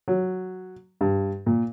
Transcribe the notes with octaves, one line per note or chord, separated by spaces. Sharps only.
F#3
G2
A#2